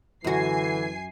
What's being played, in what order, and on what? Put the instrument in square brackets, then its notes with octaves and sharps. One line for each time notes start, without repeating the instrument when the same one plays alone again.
[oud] F#2 F#4 [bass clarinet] D3 [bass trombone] E3 [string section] G#5 C7